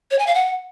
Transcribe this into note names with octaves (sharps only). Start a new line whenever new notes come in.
C#5
G#5
F5
F#5